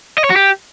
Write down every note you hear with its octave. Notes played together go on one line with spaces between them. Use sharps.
D#5
C#5
F#4
G4